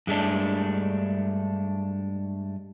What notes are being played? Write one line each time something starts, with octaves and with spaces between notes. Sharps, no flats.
G2 G#3 A3 D4